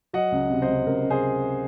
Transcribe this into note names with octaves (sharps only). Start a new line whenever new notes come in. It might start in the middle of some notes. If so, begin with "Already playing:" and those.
F#3 D#5 F#5
C#2
C3
C5 D#5
C#2
C#2 A#4
C3
G#4 C5